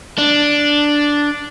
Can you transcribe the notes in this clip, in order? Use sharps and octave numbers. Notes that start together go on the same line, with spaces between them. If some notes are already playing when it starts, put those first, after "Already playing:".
D4